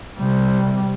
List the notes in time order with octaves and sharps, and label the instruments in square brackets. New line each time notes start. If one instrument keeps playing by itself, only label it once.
[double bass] C3 G3